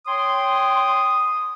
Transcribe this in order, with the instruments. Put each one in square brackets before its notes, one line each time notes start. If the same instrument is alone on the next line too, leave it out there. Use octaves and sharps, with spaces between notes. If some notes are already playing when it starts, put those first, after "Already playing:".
[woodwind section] C#5 G5 C6 [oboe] D#6